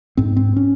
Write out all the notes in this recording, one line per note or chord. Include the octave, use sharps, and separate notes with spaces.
G#2 C4
C4
C#4